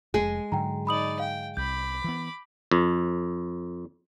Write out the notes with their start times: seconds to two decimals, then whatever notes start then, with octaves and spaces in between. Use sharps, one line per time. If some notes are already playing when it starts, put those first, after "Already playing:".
0.14 F1 G#3 G#4
0.52 G#2 D3 F#3 G5 A#5
0.87 D#4 D5 B5 D#6 F#7
1.19 F5 G5
1.57 C2 B5 D6 G6
2.04 E3 B3
2.71 F2